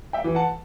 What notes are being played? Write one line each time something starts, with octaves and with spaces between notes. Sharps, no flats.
E5 G5
E3
F#5 A5